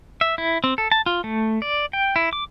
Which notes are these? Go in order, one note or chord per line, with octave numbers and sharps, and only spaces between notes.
E5
E4
C4
A4
A5
F4
A3
D5
G5
E4
D6